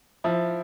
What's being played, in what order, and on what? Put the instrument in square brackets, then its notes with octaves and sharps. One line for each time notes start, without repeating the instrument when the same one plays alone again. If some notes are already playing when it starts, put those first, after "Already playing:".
[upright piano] F3 E4